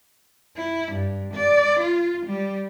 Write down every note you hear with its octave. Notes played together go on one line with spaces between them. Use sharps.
E4
G2
D5
F4
G3